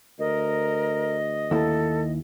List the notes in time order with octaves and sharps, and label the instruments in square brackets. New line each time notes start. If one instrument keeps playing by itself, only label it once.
[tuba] D2 [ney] A#4 [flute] D#5
[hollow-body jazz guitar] D#2 E4 [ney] A4